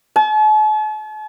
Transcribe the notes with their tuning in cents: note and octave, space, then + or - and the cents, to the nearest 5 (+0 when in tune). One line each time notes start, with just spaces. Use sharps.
A5 -45